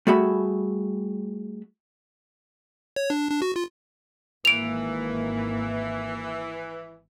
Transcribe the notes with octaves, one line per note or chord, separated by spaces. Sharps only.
G3 A3 F#4 G#4 E5 B5
C#5
D4
D4
F#4
F4
G#1 E3 A#3 D7 F7